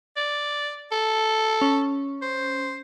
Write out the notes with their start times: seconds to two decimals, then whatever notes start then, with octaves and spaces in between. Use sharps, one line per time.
0.17 D5
0.92 A4
1.62 C#4
2.22 C5